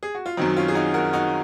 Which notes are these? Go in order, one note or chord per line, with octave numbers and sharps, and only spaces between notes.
G#4
F#4
F4
F#2 D#3 F#3 C4 D#4
C#4 F4
G#4
D#4 F#4
F#4 A#4
D#4 F#4